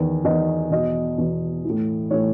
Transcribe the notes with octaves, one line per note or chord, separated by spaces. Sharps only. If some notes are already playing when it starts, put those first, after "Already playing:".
Already playing: E2 D#3
E2 D#3 D#5
E2 B2 D#5
E2 B2
E3
A2
A2 E3 C#5